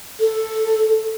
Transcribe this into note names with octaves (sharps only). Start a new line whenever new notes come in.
A4